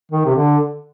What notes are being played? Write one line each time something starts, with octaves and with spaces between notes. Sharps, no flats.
D#3
C3
D3